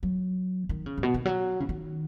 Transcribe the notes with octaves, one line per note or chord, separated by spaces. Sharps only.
F#3
D#3
C#3
G#2
B2
D#3
F#3
C#3
D#3